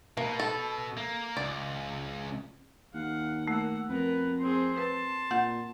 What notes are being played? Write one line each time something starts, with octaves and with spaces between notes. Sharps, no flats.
B2 A#3
A4
A#3
C#2 D5
D#2 F5 F#5
A3 A#3 F#5 E6
F2 B3 A#4 B4
C4 G#4 C6
B4 A5
A#2 F#5 G6